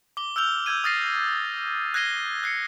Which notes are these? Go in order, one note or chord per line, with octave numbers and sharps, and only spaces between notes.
D6 G7
E6 F6 G6 F7 G7
E6 G6 G#6 D#7
D#6 F6 A6 A#6 C7 D#7
F#6 G#6 A#6 C7 D#7 G7
F#6 C7 C#7